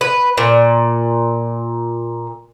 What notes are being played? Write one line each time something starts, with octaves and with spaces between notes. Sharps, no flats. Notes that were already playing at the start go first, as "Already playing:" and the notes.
B4
A#2